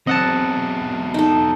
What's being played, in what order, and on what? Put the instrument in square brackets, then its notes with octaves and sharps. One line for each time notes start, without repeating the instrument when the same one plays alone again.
[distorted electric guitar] E2 F#3 [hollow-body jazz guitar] C4 [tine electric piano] D#5 F#5 A5
[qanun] D#4 A4